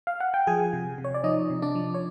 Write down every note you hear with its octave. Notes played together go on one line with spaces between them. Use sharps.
F5
F#5
G5
F3 G#4 G#5
C3
C3
C#5
D5
F3 D#4 D#5
C3
D4 D5
F3
C#5